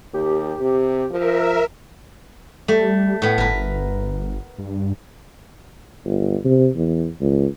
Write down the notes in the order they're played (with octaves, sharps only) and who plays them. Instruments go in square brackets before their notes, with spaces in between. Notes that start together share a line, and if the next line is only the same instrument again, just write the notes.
[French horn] D#2 [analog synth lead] G4
[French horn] C3
[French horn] F3 [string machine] A#4 E5
[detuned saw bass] G3 [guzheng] A3
[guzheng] A2 B3
[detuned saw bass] G1 [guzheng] A#4 B4
[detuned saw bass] G2
[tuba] G1
C3
E2
C#2